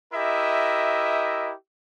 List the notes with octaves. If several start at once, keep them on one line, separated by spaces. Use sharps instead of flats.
E4 G4 A#4 D#5 E5